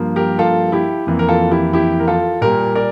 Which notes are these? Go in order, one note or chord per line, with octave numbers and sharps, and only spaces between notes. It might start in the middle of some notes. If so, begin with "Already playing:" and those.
Already playing: G2 F3 A#3
G4 A#4
F4 A4
E4 G4
F2 E3 A#3
A#4
F4 A4
E4 G4
E4 G4
A#4
F4 A4
A#2 G3 A#3 G4 A#4
A#4 D5